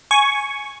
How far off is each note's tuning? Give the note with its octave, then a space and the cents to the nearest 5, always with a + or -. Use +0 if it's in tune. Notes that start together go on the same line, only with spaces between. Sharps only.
G#5 +0 C#6 +0